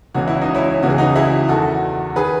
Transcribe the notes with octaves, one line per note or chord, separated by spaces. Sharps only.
C#2 C#3 E3 F#4
E4
D#4
C#4 E4
C#2 C#3 E3 F#4
G#4
D#4 F#4
E4 G#4
E2 D#3 F#4 A4
D#3 G#4 B4